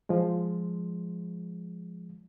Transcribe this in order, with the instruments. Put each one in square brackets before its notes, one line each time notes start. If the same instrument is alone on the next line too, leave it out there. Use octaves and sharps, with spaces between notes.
[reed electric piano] F3 G#3